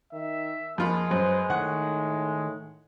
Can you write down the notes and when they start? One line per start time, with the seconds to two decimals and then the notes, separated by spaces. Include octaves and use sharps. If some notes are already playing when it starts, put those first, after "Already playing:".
0.13 D#3 E5
0.78 F2 G#3 A#3 F4 B5
1.11 F#2 B4 C5
1.50 A2 D#3 F#5 C#6 F#6